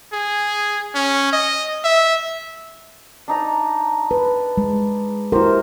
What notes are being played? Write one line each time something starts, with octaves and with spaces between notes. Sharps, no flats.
G#4
C#4
D#5
E5
D4 D#4 A#5
B4
G#3
E4 F#4 G4 A#4 C5